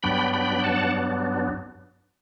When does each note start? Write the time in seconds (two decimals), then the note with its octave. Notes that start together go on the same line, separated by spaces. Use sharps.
0.03 G2 F#3 B3 D4 G5 B5
0.33 G5 B5
0.59 G5
0.64 F#5 A5